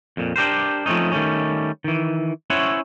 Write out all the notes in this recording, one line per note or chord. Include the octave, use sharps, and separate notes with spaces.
F2 A#2
D4 G4 A#4 C5
F3 A3 C4 C#4 D#4
D#3 G3 A3 C#4
D#3 E3
C#4 E4 C5 C#5 E5 F#5